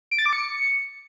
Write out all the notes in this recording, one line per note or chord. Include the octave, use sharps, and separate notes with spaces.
D7
A6
D6
C#7